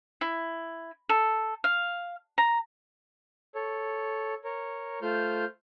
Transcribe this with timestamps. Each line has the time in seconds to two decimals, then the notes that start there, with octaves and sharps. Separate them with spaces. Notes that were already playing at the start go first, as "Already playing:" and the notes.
0.21 E4
1.09 A4
1.64 F5
2.38 A#5
3.55 A4 C#5
4.44 A#4 C#5
5.02 A3 F4 C5 F6 G6